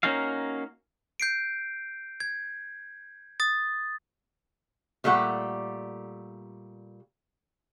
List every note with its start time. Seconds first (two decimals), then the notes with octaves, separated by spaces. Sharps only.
0.03 A#3 C#4 D#4 F#4 F5
1.20 G6 C7 D7
2.20 G#6
3.40 D#6 A6
5.04 A#2 G3 A3 G4 F#5